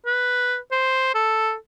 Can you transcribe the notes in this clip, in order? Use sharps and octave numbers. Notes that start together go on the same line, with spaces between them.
B4
C5
A4